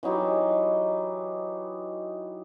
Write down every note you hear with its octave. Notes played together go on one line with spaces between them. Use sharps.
E3 F#3 D#4 G4